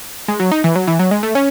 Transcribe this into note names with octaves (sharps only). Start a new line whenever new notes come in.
G#3
F#3
D#4
E3
F#3
E3
F#3
G#3
A3
C#4